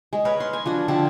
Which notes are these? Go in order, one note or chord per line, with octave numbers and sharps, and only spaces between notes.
G#3
A#4 B4 C#5
C6
G#5
F3 D4 F#4
D3 F3 C4